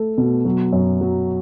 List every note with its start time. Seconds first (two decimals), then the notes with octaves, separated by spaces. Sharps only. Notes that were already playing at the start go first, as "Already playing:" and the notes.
Already playing: A3 A4
0.18 B2
0.45 F#3
0.73 F#2
1.01 F#3